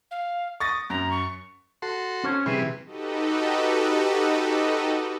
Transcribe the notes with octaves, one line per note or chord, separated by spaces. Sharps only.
F5
C#6 D#6 A6 A#6
F#2 A#5
C#6
F#4 A4 C6
C#4 C5 C#5
C3 E3 G3 E4 G#4 B4
D#4 F#4 G4 A4 B4 D#5